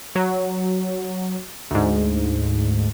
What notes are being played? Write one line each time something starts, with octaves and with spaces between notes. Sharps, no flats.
F#3
D2 G#2